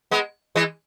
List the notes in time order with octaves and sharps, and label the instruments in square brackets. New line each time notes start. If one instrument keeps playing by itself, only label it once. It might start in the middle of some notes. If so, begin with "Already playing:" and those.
[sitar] G#3 B3
E3 G#3